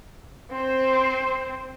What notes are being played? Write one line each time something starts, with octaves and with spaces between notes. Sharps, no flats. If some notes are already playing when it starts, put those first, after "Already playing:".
C4 C5